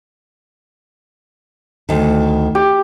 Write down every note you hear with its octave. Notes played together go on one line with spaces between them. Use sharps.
D2 D#3
G4